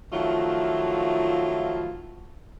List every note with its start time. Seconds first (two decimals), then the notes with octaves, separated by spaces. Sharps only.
0.13 D#3 F3 F#3 A3 E4 F4